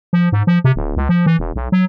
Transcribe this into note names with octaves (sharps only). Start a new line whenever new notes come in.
F3
G#2
F3
C3
D1
C#2
F3
E3
E1
B1
F#3